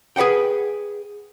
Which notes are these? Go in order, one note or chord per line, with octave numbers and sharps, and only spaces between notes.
G#4 B4 C#5 F#5 G5